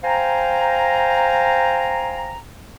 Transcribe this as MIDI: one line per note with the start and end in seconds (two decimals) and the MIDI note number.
0.04 2.36 72
0.04 2.36 77
0.04 2.36 79
0.04 2.36 80
0.04 2.36 82